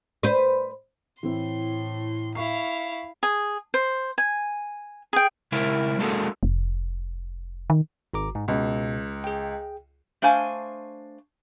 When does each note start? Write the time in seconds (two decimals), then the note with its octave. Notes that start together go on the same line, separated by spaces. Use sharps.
0.23 B4 C5
1.23 A2 E3 C4 E4 C6
2.35 E4 F5 C#6 C7
3.23 G#4
3.74 C5
4.18 G#5
5.13 G#4 G5
5.52 C#3 G#3 E4 A#4
5.99 G#3 A#3 D4 F#4 G#4 A4
6.43 F1
7.70 D#3
8.13 G#1 A#5 D6
8.35 G#2
8.48 C#2 B2
9.24 G#4 G5
10.22 A3 D4 C5 F5 G#5